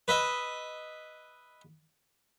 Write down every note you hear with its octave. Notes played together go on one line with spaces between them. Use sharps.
B4 D#5 E5